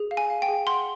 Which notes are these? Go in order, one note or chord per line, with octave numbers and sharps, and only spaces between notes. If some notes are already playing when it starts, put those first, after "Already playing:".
Already playing: G#4
F5
G#5
F5
G5
G#4
F#5 C6